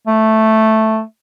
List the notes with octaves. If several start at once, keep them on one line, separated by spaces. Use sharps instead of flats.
A3